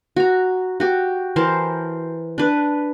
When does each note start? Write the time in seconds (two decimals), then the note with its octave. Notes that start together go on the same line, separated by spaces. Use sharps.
0.16 F#4 A#5
0.80 F#4 G4
1.36 E3 A#4 C5 A5
2.38 D4 B4